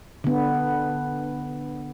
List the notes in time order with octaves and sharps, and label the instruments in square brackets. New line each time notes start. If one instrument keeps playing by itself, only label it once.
[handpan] D3 B3